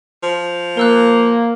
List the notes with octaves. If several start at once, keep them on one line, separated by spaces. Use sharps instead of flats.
F3
A#3 A#4 E6 F#6